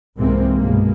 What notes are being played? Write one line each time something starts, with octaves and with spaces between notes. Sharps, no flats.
C2 G#2 C3 E3 A#3 C4
G2 B2 G#3 A#3